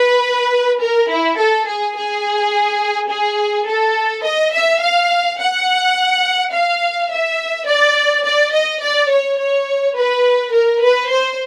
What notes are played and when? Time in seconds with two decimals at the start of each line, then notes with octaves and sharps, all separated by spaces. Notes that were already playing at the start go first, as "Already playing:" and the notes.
Already playing: B4
0.82 A#4
1.10 E4
1.38 A4
1.67 G#4
1.96 G#4
3.10 G#4
3.67 A4
4.24 D#5
4.53 E5
4.81 F5
5.39 F#5
6.53 F5
7.10 E5
7.67 D5
8.24 D5
8.53 D#5
8.81 D5
9.10 C#5
9.39 C#5
9.96 B4
10.53 A#4
10.82 B4
11.10 C5